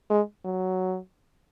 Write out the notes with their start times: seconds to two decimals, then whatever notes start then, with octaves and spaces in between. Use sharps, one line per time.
0.10 G#3
0.45 F#3